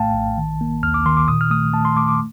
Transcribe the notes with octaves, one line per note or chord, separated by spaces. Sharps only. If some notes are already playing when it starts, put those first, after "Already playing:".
Already playing: A#1 A2 A3 F5 G5 A5
A#1
D#3
A#3
D#2 F6
D6
D#3 C6
D6
A#2 D#6
F6
A3 D#6
A3 A5
C6
A3 D6
D6